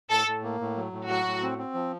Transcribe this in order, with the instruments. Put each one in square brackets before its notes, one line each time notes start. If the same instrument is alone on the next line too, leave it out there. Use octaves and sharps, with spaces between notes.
[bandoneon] A2 [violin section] A4
[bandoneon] A2
A#3
A2
F#3
A2
[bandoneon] F#3 [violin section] F#4
[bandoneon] A2
C4
C4
F3